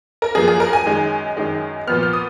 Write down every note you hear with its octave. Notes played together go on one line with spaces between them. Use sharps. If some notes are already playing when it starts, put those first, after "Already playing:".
A#4
F#2 F3 A#3 G#4
G#4
A#4
G#5
F#2 D#3 G#3
F#2 D#3 G#3
A#2 F3 B3 F6
F6
D#6